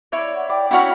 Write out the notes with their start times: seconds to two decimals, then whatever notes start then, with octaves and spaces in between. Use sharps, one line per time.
0.12 E4 C#5 D5
0.35 F#5
0.49 D5 G5
0.71 C#4 E4 F#4 C#5 F#5 B5